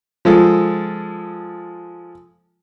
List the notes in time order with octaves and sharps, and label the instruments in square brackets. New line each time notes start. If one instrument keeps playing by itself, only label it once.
[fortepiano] F3 G#3 A4